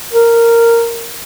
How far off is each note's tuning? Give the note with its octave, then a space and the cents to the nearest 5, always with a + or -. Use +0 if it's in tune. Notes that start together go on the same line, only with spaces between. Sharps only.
A#4 -10